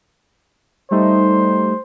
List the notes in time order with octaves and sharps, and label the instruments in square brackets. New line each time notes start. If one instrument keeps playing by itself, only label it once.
[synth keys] G3 A3 D#4 [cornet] C5